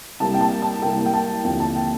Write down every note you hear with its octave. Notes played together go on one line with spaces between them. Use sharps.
C2 C3 G3 A#3 A5
G5
A5
A5
C2 C3 G3 A#3 G5
G5
A5
D#2 D3 F3 C4 G5
A5
G5